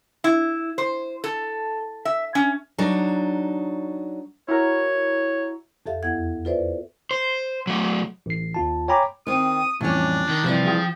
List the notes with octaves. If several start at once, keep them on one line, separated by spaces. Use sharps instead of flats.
E4
C5
A4
E5
C#4
F#3 D4 D#4
E4 F#4 A#4 C#5
F2 G4 A4 E5 F5
E2 B3 E4 F#5 G#6
F4 A4 B4 C5 D5 E5
C5
F#3 A3
A1 C7
D#2 F4 A5
C#5 G5 G#5 A#5 B5 D6
D#3 C4 D#6
F2 A2 E3 G3 C#4 D4
D#3
C2 C3 E3 F3 G3
F4 G#4 G5